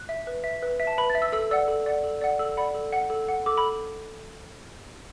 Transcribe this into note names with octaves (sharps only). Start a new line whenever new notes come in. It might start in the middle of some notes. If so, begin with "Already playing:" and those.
Already playing: F#6
E5
B4
E5
B4
E5
A5
B4 B5
A6
E5
E6
A4 E6
D5 F#5 E6
A4
D5 F#5
A4
D5 F#5
A4 E6
D5 F#5 B5
A4
F#5
A4
F#5
A4 D6
B5